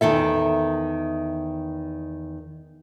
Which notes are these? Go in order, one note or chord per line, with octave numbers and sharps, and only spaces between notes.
E2 D#3 A4 E5